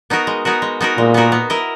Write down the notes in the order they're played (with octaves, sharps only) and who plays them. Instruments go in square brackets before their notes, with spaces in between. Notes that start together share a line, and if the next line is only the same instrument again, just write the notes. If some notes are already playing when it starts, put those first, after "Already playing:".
[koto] B3 D#4 F#4 A#4
G#3
B3 D#4 F#4 A#4
G#3
B3 D#4 F#4 A#4
[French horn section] A#2 [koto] G#3
[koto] B3 D#4 F#4 A#4
B3
E4 A#4 D#5